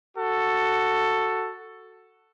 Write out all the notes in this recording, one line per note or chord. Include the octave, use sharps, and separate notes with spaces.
F#4 A4